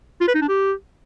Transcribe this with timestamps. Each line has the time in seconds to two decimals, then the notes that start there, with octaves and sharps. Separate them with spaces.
0.21 F4
0.28 B4
0.35 D#4
0.42 D4
0.48 G4